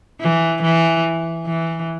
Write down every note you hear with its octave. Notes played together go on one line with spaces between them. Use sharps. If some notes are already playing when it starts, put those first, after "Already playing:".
E3
E3
E3